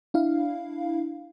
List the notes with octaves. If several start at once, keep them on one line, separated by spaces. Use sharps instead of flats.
D4 E4 F5